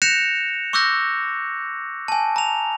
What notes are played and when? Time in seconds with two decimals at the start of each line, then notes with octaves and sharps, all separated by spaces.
0.02 F#6 G6 A#6 C#7 E7 F7
0.73 C#6 D6 E6 F#6 G6 A#6
2.08 G#5 A5
2.36 A#5 F7